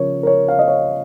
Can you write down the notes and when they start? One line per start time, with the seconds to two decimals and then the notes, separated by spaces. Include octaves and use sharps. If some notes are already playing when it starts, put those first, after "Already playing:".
Already playing: C#3 F3 A#4 C#5
0.23 A#4
0.27 C#5
0.49 F5
0.59 D#5
0.68 C#5